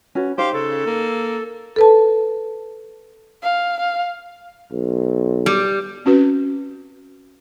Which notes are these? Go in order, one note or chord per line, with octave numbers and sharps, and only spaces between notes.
C#4 F#4 B4
D#4 G4 C5 F5
C#3 A4
A#3
A4 B4 A5
F5
F5
B1
G3
C4 C#4 F#4 B4